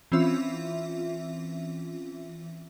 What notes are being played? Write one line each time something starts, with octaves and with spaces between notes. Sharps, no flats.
E3 C4 C#4 F4 E5